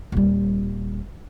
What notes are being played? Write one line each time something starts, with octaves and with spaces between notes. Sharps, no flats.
D#1 G3